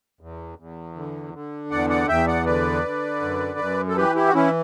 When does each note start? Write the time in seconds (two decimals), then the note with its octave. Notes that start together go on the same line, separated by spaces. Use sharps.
0.21 E2
0.59 E2
0.96 D3
1.34 D3
1.71 E2 D5 F#5
1.90 D5 F#5
2.08 E2 E5 G5
2.27 D5 F#5
2.46 D3 B4 D5
2.84 D3
3.21 F#2
3.59 F#2
3.88 A4
3.96 E3 G4 B4
4.15 E4 G4
4.27 F#4
4.34 E3 C#4 E4